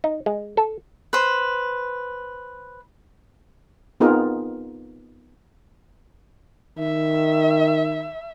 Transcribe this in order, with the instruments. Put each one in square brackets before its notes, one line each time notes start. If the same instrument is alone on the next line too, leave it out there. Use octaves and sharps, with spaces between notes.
[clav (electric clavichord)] D#4
G#3
A4
[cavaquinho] B4 C5
[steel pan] B3 C4 D#4 F4 G#4 A#4
[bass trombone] D#3 [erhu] E5